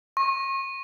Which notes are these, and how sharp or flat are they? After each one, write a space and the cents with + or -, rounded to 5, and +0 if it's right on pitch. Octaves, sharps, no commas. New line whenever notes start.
C#6 -40